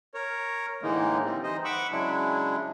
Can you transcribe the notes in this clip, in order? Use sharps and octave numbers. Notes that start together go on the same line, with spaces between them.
A#4 C#5
A2 D3 E3 G#3 A#3 D#4
G3 C4
E3 D#4 C5 D#5
F#5 B5 C#6 D6 E6
C#3 F#3 G#3 D4 E4